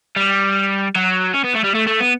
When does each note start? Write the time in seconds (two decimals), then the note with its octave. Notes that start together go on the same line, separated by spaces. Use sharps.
0.16 G3
0.96 F#3
1.34 C#4
1.44 B3
1.55 A3
1.64 G3
1.74 A3
1.87 A3
2.00 B3